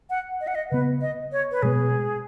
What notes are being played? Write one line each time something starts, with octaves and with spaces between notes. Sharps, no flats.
F#5
D#5
F#5
D#5
C#3 B3 B4
D#5
C#5
B4
B2 G#3 B3 G#4